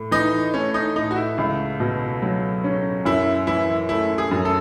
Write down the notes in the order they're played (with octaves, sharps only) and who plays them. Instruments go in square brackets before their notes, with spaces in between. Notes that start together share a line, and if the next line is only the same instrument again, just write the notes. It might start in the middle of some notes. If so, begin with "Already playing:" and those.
Already playing: [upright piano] A2
[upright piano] E3 [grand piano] D#4
[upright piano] A3 [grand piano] C#4
[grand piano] D#4
[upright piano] A2 [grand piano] D#4
[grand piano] F#4
E4
[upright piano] C#2
B2
F#3
C#4
[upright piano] F#2 [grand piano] E4
[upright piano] E3 [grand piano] E4
[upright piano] A3 [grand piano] E4
[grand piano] G#4
[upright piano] F#2
[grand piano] A4